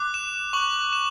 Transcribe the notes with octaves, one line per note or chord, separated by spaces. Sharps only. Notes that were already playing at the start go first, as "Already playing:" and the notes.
Already playing: D6 F#6
E7
C#6 F#6 F#7
E7